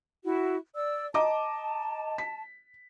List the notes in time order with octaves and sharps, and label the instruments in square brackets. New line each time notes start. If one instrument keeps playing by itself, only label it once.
[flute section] E4 F#4
D5 E6
[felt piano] D#5 A#5 D6 [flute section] A5
[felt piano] B6